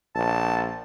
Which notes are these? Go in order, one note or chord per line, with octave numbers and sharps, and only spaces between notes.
A#1 A5